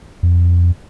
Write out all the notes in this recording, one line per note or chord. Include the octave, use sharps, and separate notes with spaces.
F2